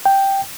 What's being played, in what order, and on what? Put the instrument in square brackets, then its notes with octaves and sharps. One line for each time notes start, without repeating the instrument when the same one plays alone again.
[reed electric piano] G5